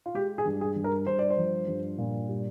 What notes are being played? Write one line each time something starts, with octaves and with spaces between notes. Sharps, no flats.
F4
G#3 G4
G#4
G2
G#4
G2
A#4
G2 C5
D5
C5
F3
G2
A#2
G3